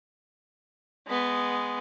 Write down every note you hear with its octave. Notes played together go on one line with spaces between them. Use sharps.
G#3 B3